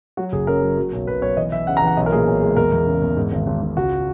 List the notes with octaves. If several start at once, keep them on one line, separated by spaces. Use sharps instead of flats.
F#3 F#4
F#1 G#4
F#2 A#4
F#3
F#3
B1
B1 B4
B1 C#5
E3 D#5
E3 E5
C#3 F#5
A#5
E3 F#5
B1 D#5
A#4
A#2 G#4
B1
G#3
E2 A#4
E2
C#3
E2
G#2
G#1
G#1
G#1
C#2 F#4